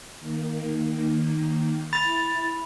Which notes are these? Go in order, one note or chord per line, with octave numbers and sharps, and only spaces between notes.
D#3 A#3
E4 B5 A6